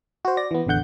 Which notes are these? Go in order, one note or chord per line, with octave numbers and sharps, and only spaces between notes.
F#4 C5
D5 A#6
E3 B3
A1 E2 D3 F#5 G6